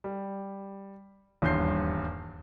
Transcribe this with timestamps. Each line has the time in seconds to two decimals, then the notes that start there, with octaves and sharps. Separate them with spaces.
0.04 G3
1.42 D#1 E2 G2 C6 G6 C7